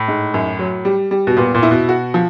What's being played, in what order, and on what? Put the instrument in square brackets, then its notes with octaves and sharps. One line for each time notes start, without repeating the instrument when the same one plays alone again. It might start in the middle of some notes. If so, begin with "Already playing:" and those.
Already playing: [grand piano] A2
[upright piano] G#2
F#2
F#3
G3
G3
[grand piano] B2
[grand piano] A#2 [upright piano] B3
[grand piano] A#2
[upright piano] E4
[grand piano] B2
[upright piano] F#4
F3